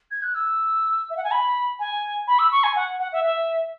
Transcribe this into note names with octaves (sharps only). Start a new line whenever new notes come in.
G#6
F#6
E6
E5
F#5
G#5
B5
G#5
B5
E6
C#6
G#5
F#5
F#5
E5
E5